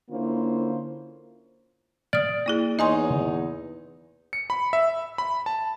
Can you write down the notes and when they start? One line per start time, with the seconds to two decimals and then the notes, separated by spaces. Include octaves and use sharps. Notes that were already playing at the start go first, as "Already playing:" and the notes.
0.10 D3 A#3 C#4 E4 F4 C5
2.13 D5 D#6 F6
2.46 A#3 E4 G#4
2.79 E2 D#4 C#5 D#5 G#5 C6
4.33 C#7
4.50 B5
4.73 E5
5.18 B5
5.46 A5